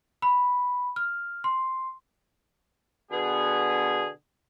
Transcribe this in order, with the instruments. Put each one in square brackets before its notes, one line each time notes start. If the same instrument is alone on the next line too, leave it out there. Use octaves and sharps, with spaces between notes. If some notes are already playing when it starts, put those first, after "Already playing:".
[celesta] B5
F6
C6
[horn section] B2 D3 B3 G#4